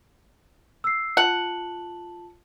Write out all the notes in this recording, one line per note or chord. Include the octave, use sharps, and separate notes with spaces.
E6 C7
F4 F#5 A5 F#7